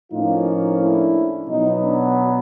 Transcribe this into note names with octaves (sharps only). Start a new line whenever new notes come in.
A2 F3 A#3 C#4 D#4 F4
D4 E4
B2 F#3 B3 D#4
D4